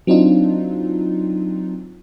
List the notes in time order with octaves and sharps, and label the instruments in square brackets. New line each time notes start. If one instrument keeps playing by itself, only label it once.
[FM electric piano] F#3 C4 D4 D#4 F4